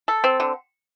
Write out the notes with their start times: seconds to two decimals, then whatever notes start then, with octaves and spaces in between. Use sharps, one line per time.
0.08 A4
0.24 C4
0.40 D3